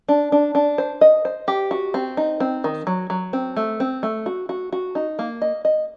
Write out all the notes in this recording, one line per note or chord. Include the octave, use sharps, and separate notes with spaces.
D4
D4
D4
C5
D#5
C5
G4
F#4
C4
D#4
C4
D#3
F#3
F#3
C4
A3
C4
A3
F#4
F#4
F#4
D#4
A#3
D#5
D#5